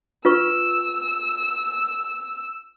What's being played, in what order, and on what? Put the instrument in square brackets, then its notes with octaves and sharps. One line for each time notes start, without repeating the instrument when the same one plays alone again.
[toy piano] F4 B4 C#6 [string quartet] E6